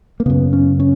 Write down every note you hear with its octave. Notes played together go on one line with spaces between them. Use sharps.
A#3
F#2 C#3 B3
C#4
C#4